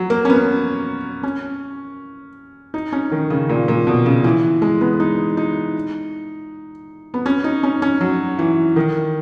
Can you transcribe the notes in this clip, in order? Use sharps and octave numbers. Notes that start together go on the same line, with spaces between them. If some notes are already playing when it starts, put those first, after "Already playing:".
Already playing: F#3
A#3
C#4
B3
C#4
D#4
C#4
D#3
C#3
A#2
A#2
B2
C#3
E3
G#3
B3
D#4
D#4
B3
C#4
D#4
C#4
C#4
F#3
E3
D#3